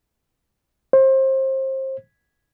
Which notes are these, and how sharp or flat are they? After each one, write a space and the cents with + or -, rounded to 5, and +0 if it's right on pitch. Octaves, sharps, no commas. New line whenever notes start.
C5 +30